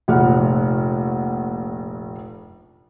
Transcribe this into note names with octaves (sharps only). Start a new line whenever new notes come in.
F1 A#1 F#5 F6